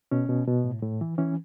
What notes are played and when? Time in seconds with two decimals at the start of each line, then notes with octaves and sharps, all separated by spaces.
0.11 B2 C#4
0.29 B2
0.47 B2
0.64 A2
0.82 A2
1.01 E3
1.18 E3 C#4